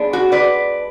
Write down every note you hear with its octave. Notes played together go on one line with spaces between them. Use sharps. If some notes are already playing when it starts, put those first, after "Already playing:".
Already playing: G#3 B3 D4
F#4
B4 D5